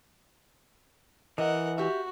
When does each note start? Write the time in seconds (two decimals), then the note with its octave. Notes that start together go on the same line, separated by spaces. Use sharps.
1.38 E3 A#4 D#5 F#5
1.78 F#4 G4 E5